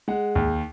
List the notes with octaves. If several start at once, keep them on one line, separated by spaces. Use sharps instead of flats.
G#3 F#5
D#2